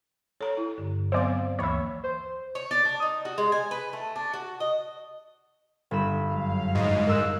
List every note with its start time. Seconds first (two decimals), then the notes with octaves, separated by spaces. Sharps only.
0.41 A4 C#5 A#5
0.57 E4
0.78 G2 D3
1.12 F#3 B3 C4 C5 D5 F5
1.59 D2 E3 A#3 C#5 E5 B5
2.04 C5
2.55 C#5
2.71 D5
2.85 D4
3.02 D#4
3.25 F#4
3.38 G#3
3.52 G#5
3.71 B4
3.93 A3
4.16 D4
4.33 F#4
4.60 D#5
5.91 G1 B5 E7
6.30 F#2 F#3 F5
6.75 G#2 D#5
7.07 A#4 E6 F#6